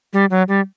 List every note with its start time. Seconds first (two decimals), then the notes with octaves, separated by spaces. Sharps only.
0.13 G3
0.31 F#3
0.48 G3